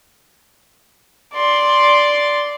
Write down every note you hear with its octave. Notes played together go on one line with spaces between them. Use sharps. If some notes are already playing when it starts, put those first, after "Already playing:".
D5 C6